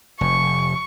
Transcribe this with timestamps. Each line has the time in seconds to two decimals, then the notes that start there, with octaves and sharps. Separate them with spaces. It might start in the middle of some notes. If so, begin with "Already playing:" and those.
0.21 F1 C#6